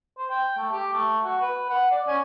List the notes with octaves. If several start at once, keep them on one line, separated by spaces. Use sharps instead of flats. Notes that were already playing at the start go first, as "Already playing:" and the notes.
C5
G5
A3
G4
A3
F#4
B4
F#5
D5
C#4